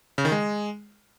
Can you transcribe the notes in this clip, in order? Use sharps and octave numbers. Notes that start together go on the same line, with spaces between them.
C#3
D#3
G#3